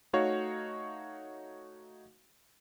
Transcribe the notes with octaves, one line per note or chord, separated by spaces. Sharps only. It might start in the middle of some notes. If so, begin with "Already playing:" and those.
A3 D#4 F#4 C#5 F5